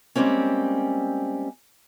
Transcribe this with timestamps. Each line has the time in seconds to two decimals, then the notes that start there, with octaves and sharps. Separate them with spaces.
0.16 G3 G#3 A#3 C4 C#4